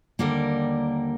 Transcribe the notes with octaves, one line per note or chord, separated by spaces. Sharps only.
D#2 D3 G3 A#3 A#4